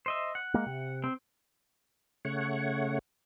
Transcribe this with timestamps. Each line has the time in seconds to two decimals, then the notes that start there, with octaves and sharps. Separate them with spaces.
0.06 C5 D#5 E5
0.35 F#5
0.54 G#3 A#3
0.66 C3
1.04 C4
2.25 C#3 A3 C#5 F#5